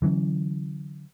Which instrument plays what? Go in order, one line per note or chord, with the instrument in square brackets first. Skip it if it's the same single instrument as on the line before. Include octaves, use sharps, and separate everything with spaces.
[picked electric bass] D3 E3 F#3 C#4